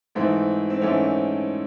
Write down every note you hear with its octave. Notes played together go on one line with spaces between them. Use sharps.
G#2 E3 A3 C4
C4
G#2 E3 A3 C#4